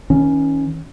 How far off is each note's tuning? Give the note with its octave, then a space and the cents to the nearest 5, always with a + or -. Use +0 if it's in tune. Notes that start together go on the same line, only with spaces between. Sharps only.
D#3 +45 C#4 +0